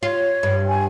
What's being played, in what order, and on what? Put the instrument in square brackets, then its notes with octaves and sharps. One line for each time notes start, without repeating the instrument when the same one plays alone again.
[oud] F4 [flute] C#5
[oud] G2
[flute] G#5